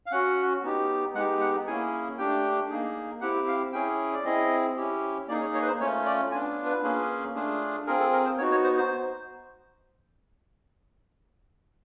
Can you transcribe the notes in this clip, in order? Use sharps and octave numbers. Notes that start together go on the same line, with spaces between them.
F5
C#4 F#4 F#5
B3 D#4 G4
G#3 B3 D#4 G4 F#5
F#5
A#3 C#4 E4 G#4 G#5
A3 D4 G4 G5
A#3 D#4 G#4
C4 E4 G4 F#5
F5
C#4 E4 G#4 G5
D5
C4 E4 G#4 D#5
C#4 E4 G4
A#3 D#4 G#4 D5
C#5
C#5
B4
C5
A3 C#4 F4 C#5
D5
B3 D4 F4 G#5
B4
A#3 C#4 F4 G#4
A3 D4 F4 G#4
C4 F4 G#4 A#4
A4
A#4
C5
B3 D#4 F#4 C#5
C#5
C5
C5